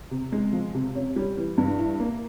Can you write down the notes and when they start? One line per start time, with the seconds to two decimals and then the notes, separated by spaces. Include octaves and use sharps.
0.11 C3
0.32 G#3
0.53 F3
0.75 C3
0.95 C#4
1.16 G3
1.37 E3
1.58 G2
1.79 E4
2.00 A#3